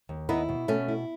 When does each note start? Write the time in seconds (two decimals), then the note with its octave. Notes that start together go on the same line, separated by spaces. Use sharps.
0.09 D#2
0.29 B3 D#4 E4
0.49 B2
0.68 B2 A3 C#4
0.88 E4